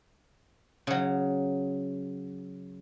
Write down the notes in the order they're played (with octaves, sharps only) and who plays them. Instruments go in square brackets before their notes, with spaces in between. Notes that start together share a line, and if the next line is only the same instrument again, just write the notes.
[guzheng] C#3 F#3